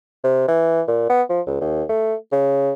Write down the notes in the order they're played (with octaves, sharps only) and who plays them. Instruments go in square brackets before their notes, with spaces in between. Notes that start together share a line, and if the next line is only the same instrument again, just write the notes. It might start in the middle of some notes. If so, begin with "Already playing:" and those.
[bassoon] C3
E3
A#2
B3
F3
C#2
D#2
A3
C#3